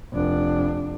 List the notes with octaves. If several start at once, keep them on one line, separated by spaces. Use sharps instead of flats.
F1 D4